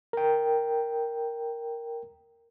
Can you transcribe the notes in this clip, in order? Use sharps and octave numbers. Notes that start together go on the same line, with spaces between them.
A#4 G5